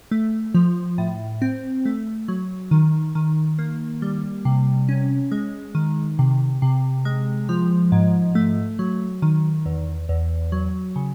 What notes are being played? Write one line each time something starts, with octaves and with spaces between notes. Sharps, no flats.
A3
F3
A2
C4
A3
F#3
D#3
D#3
A#3
G3
C3
C#4
G#3
D#3
C3
C3
G#3
F3
G#2
A3
F#3
D#3
E2
E2
F#3
C#3